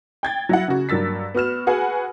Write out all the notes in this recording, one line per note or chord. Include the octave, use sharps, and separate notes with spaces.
G5 G#6 A6
F#3 E4 F#5
C#3 F#4
G2 F#3 A#4 E6 A6 B6
B3 F#4 F6 E7
F#4 G#4 B4 F#5 G#5